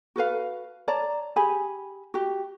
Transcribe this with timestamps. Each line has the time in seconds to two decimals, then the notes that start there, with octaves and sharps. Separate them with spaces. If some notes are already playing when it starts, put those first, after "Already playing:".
0.16 F#4 A4 B4 F5
0.88 C#5 D5 A5 A#5
1.36 G4 G#4 G#5 B5
2.14 F#4 G4